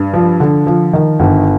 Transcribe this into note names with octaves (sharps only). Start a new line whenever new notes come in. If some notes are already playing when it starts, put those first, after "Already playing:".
Already playing: G2
F3
D3
F3
D#3
G1